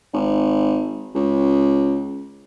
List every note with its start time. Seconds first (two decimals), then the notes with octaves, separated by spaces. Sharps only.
0.13 G#1
1.15 C#2